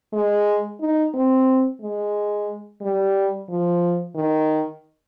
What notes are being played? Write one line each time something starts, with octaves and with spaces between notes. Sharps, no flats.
G#3
D#4
C4
G#3
G3
F3
D#3